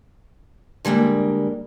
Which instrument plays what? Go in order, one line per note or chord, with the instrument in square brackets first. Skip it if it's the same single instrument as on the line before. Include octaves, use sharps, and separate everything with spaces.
[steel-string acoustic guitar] D3 G3 G#3 A#3